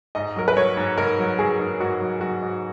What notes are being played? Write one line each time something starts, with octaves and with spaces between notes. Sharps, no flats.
G#2 D#5
F#3 A#4
B4
F#3 C#5
G#2
G#2 A#4
F#3
F#3 G#4
G#2
G#2 F#4
F#3
F#3 F#4
G#2